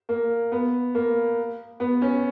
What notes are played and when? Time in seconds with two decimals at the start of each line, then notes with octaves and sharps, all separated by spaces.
0.09 A#3
0.52 B3
0.95 A#3
1.80 B3
2.02 C#4